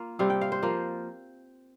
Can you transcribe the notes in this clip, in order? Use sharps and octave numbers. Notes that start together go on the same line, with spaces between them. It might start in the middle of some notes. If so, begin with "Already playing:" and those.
Already playing: A#3 F4
C3 G3 C4 F5
G5
F5
C5
F3 A#3 F4